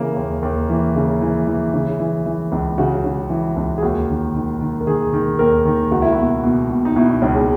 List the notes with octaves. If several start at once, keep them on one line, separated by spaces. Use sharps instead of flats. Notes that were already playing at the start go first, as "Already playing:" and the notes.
Already playing: C#3 E3 A#3
D#2
D#2
E3
C#3
E3
E3
C#3
E3
E3
C#2
C#3 F#4
C#3
E3
C#2
G#4
D#2 F#4
D#3
D#3
D#3
A#4
D#3 G#4
D#3
D#2 A#4
D#3
C#2 F#4
E4
F#4
B2
B2
B2
D#4
B2 E4
D#4
C#2 C#4
G#3